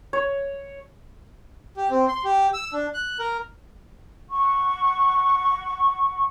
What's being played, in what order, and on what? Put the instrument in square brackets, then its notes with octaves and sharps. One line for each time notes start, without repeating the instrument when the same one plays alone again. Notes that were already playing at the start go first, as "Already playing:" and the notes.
[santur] C#5
[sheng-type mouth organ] G4
C4
C6
G4
E6
D4
F#6
A#4
[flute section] F#5 C#6